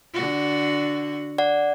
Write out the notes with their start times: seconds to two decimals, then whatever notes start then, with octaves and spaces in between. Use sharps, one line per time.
0.14 D3 F#4
1.38 D5 F#5